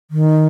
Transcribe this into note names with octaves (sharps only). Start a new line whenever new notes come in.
D#3